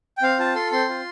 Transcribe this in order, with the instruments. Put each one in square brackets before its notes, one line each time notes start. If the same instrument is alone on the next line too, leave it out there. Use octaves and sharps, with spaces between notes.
[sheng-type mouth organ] G5
C4 F5
F4 A5
A4 C6
C4 C6
F4